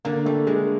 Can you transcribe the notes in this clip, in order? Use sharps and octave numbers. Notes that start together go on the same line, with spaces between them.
D3 A#3
G3 A3
D3 G#3